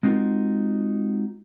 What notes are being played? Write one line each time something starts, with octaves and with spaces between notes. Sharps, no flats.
G#3 C4 D#4 F4 F#4 A#4